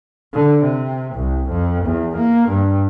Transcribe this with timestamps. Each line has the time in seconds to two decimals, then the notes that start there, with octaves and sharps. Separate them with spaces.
0.34 D3
0.63 C3
1.15 C2
1.50 F2
1.85 E2
2.17 A#3
2.49 G2